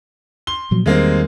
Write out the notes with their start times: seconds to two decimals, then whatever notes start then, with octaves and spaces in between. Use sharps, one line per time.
0.47 C6 G7
0.71 A#2 F3 F#3
0.86 E2 D#3 G3 G#3 A#3 C4